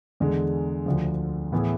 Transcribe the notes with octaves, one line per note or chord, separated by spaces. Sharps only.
E2 D3 G#3
D2 D3 F3
A2 E3 B3 E4 G#4